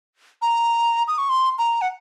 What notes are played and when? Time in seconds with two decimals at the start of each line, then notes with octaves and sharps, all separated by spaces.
0.42 A#5
1.08 D#6
1.18 C#6
1.29 C6
1.58 A#5
1.82 F#5